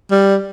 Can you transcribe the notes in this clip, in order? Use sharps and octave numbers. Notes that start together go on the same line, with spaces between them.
G3